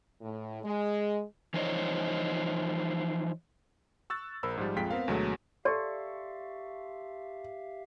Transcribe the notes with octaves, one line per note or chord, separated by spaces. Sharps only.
A2
G#3
E3 F3 D#4 C5 C#5 D#5
C#6 E6 F#6 A6
A#1 A#4 C5 B5 E6
G#2 F3 G3
A#1 F2 G#3 F4 G5 B6
B3 C4 A#4 F5
D2 B2 F#3 G#3 A3
G4 A4 D5 E5 F5 C6 C#6